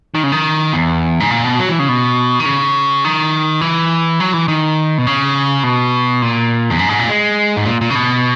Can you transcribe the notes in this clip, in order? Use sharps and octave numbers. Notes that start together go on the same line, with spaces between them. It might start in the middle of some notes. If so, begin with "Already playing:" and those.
D#3
C#3
D#3
E2
G#2
A#2
B2
F#3
E3
C#3
B2
D#3
C#3
D#3
E3
F#3
E3
D#3
B2
C#3
B2
A#2
E2
F#2
G#2
A#2
G#3
G#2
A#2
A#2
C#3
B2